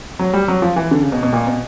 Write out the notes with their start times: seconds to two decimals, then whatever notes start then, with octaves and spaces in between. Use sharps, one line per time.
0.19 F#3
0.33 G3
0.48 F#3
0.62 F3
0.76 E3
0.91 D3
1.02 C#3
1.12 B2
1.23 B2
1.33 A#2
1.47 B2